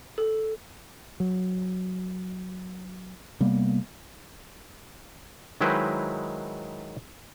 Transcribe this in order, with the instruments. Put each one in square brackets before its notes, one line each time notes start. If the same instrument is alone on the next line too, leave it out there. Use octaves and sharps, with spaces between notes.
[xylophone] A4
[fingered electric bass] F#3
C3 G3 A#3 B3
[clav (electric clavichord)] D#3 F#3 G#3 E4 B4 C5